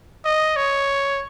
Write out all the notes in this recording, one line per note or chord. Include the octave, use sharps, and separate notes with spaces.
D#5
C#5